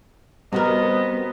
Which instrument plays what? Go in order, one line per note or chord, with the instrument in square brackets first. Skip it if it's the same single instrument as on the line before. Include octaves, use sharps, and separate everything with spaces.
[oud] C3 F#4 A#4 [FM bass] G3 [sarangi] B3 [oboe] D#5